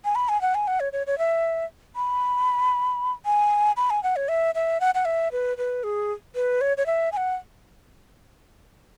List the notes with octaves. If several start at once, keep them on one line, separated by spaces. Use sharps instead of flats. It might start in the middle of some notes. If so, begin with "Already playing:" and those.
G#5
B5
G#5
F#5
G#5
F#5
C#5
C#5
C#5
E5
B5
G#5
B5
G#5
F#5
C#5
E5
E5
F#5
F#5
E5
B4
B4
G#4
B4
C#5
C#5
E5
G#5
F#5